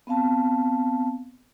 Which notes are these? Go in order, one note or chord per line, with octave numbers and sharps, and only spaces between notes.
B3 C4 F5 A5